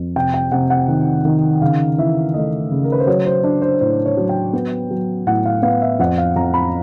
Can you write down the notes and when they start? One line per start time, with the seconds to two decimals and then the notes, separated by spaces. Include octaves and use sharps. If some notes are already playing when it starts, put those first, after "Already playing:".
Already playing: F2
0.16 C3 G5
0.34 G5
0.52 C3 F#5
0.70 F#5
0.88 D#3
1.25 D#3
1.61 C#3 F5
1.98 E3 E5
2.34 A3 D#5
2.71 C#3
2.84 A#4
2.92 B4
3.00 C5
3.07 F#3 C#5
3.26 C5
3.44 D4
3.62 C5
3.81 A2 C5
4.06 C#5
4.17 F#3
4.29 G5
4.53 B3
4.91 F#3
5.27 A2 F#5
5.45 F5
5.63 B3 F5
5.81 E5
5.99 F2 F#5
6.18 F5
6.36 F2 A#5
6.54 B5